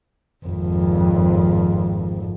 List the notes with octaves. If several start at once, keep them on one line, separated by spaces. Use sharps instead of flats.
G#1 F2